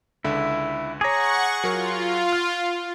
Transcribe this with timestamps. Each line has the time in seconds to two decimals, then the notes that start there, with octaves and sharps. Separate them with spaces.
0.25 C#2 D3 E4 E5
1.01 G#4 C#5 F#5 A#5 C#6 D6
1.64 F#3 F4 A#4 C#5
2.33 F6